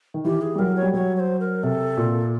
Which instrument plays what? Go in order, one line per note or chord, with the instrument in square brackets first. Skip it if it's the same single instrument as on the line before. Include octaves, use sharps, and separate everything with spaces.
[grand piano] D#3
[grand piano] E3 [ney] G4
[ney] G#4
[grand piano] G3
[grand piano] F#3 [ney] A#4
[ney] C#5
[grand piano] G3
[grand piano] F#3 [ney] C#5
[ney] C#5
C5
A#4
[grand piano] C3 [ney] A4
[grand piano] A#2